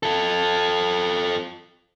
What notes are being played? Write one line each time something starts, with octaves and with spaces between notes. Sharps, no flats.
F4 A4